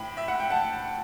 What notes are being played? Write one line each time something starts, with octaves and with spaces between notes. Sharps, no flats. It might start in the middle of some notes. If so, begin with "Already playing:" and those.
Already playing: A2 G5 B5
E5
F#5
G5
F#5 A5